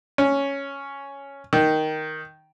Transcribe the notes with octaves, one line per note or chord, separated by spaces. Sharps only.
C#4
D#3